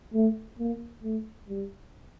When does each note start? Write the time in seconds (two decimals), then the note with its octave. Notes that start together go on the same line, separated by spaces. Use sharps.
0.14 A3
0.59 A#3
1.03 A3
1.49 G3